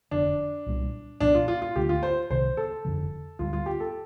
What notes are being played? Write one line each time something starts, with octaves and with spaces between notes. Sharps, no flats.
F1 F2 D3 D4
C2 A#2 G3
C2 A#2 F3 D4
F4
F4
F4
D2 D3 A3 G4
F4
C5
C2 C3 D#3 C5
A4
F1 F2 D3 F3
D2 D3 G3 F4
F4
G4
A4